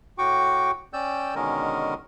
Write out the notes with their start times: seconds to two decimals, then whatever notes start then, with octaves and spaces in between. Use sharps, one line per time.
0.18 A2 F#4 G5 C#6 D6
0.93 C#4 D5 G5 E6 G6
1.35 B2 D3 D#3 G#3 C#4 A#4